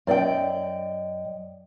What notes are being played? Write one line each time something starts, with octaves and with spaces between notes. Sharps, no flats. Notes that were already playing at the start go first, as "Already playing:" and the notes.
F#2 D5 D#5 G5